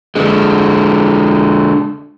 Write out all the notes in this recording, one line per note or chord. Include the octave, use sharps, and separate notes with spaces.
D3 G#3